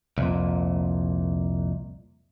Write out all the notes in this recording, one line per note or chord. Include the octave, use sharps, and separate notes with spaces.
C2 F2 A#2